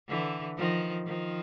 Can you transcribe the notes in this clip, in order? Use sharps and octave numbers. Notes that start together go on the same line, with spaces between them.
D3 E3
D#3 F3
D#3 F3